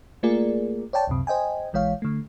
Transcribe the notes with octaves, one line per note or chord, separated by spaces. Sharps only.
A3 A#3 F4 G#4 A#4 D5
C#5 D5 G5 A5
C#2 F#2 C3
C5 D#5 G5 G#5
A#1 E3 G#3 C#5 F5
D3 A3